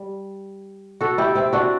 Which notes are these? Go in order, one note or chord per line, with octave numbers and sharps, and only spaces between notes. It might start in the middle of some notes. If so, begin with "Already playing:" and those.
Already playing: G3
F#4 A4
E4 G4
C4 E4
D4 F#4